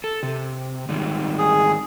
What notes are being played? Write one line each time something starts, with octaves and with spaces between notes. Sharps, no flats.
A4
C3
G#2 D#3 G3
G#4